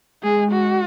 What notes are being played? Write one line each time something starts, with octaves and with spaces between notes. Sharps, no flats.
G#3 G#4
F#4